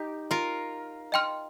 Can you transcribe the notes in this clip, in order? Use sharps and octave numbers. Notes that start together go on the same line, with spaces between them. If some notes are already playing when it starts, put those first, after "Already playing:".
Already playing: D#4 G4
F4 A#4
D#5 G5 C6 F6